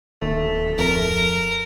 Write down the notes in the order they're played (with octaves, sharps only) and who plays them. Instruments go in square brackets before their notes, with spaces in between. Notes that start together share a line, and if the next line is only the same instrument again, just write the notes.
[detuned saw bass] D1 [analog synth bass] D#2 [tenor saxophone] A3
[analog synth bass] F2 [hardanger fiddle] A#4